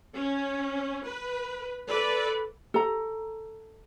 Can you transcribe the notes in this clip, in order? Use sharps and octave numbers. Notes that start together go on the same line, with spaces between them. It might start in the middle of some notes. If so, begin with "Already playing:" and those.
C#4
B4
A4 B4 D5
A4 A#5